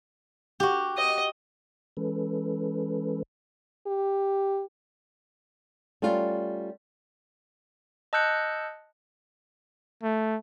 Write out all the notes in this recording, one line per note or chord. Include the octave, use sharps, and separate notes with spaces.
F#4 G4
D#5
E3 G#3 C#4 A4 B4
G4
G3 A3 C#4 F4
D#5 A5 E6 F#6 G6 C#7
A3